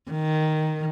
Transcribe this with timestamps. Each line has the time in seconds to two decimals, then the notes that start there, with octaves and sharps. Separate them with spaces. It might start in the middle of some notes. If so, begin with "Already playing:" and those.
0.11 D#3